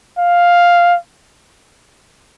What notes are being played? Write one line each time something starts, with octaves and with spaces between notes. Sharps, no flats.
F5